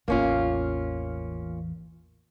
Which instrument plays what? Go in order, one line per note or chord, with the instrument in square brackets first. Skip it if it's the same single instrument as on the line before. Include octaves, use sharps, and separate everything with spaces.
[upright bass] A1 E2 [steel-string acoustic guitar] A#3 C#4 F4